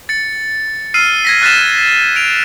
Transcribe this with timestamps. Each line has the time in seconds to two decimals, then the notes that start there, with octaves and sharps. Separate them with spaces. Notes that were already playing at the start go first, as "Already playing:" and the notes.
0.09 A6 C#7
0.94 E6 F6 C7 D#7
1.25 G#6 A#6 B6
1.42 F6 F#6 A6 B6 E7
1.78 A#6
2.16 D7 F7